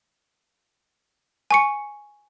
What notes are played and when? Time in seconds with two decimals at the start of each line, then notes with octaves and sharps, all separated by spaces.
1.51 G#5 C#6 C#7